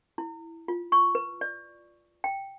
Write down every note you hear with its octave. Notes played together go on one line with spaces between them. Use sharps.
E4
F4
C#6
B4
D5
G5